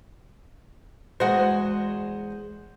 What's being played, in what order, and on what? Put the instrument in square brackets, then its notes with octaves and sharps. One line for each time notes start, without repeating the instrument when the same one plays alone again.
[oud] E2 G#3 F#4 [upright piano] C5 F#5